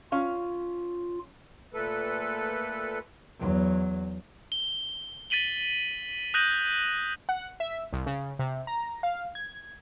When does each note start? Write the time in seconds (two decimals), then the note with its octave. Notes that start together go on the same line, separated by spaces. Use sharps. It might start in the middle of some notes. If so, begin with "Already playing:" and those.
0.12 C#4 F4 F5
1.74 A#2 A3 A4 B4
3.39 E2 F#3
4.52 G7
5.30 A6 B6 D#7 F#7 G7
6.34 D#6 F#6 G6 A#6 D#7 F#7
7.29 F#5
7.60 E5
7.93 C2
8.06 C#3
8.39 C3
8.67 A#5
9.03 F5
9.35 G#6